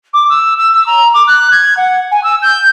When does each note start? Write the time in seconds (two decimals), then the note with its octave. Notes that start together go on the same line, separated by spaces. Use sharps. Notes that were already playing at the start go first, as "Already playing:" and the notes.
0.13 D6
0.29 E6
0.57 E6
0.73 E6
0.86 A#5
1.14 D6
1.27 F#6
1.51 G#6
1.77 F#5
2.11 G#5
2.23 E6
2.42 G6